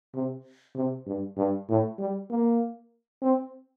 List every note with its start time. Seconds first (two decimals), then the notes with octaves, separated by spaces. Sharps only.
0.15 C3
0.76 C3
1.07 G2
1.37 G2
1.69 A2
1.99 G3
2.31 A#3
3.22 C4